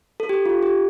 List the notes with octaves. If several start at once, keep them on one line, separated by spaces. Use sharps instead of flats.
A4
G4
F4
G4